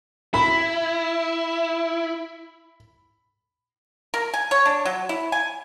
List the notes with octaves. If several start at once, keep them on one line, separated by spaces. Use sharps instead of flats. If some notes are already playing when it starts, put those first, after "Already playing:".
E4 B5
A#4
G#5
C#5
D4
F#3
E4
G#5